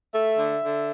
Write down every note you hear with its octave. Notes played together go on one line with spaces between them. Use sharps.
A3 E5
D3
D3